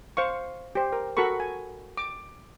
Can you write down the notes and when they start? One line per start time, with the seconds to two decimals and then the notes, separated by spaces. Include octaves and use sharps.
0.17 C5 F5 C#6
0.75 G4 C5
0.92 A#4
1.17 F#4 A4 A#4 B5 C#6
1.40 G#5
1.97 D6